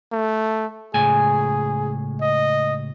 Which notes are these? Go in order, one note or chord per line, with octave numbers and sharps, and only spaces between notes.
A3
C#2 A2 G#4 G#5
D#5